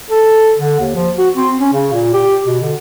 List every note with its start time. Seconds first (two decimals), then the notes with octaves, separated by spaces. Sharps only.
0.10 A4
0.57 D3
0.80 D#2
0.95 F3
1.18 F#4
1.35 C4
1.60 C#4
1.73 C#3
1.93 A#2
2.13 G4
2.46 B2
2.61 D3